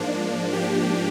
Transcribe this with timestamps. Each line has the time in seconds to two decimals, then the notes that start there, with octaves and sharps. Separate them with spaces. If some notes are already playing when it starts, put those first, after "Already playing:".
Already playing: G#2 F3 A#3 D4
0.53 G4